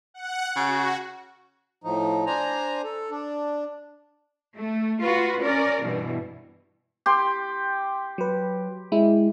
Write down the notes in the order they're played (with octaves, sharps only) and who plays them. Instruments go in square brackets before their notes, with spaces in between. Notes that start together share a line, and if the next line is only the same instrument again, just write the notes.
[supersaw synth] F#5
[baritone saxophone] C#3 [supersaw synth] F#4
[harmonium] A2 F3 D#4
D4 C5 G#5 A#5
A4
D4
[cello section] A3
F4 F#4 B4
C#4 A#4 D5
G2 B2 E3
[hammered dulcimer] G4 C6
[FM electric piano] F#3 B4
G#3 E4